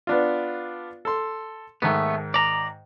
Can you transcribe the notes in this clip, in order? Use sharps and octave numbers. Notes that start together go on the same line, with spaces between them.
B3 D4 F4
A4 C6
G#2 D#3 A3 B3
D5 A#5